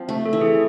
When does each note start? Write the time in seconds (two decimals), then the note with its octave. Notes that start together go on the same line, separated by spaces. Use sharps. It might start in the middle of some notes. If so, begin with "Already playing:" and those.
Already playing: F3 C4
0.09 A3
0.26 A4
0.33 E3
0.41 G#4